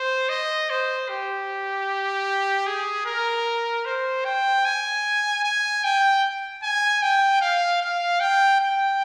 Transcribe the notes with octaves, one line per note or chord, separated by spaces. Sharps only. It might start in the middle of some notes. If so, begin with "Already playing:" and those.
Already playing: C5
D#5
C5
G4
G#4
A#4
C5
G5
G#5
G#5
G5
G#5
G5
F5
F5
G5
G5